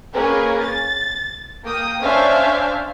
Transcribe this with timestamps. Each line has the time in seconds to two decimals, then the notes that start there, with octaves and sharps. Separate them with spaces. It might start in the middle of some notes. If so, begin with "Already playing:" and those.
0.14 A#3 C#4 G#4 A#4 B4
0.60 A6
1.63 A#3 G5 D#6
2.02 C#4 D4 C5 E5 F5